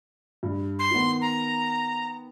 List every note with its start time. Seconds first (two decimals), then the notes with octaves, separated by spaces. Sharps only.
0.43 G2
0.79 C6
0.91 D#3 B3
1.21 A#5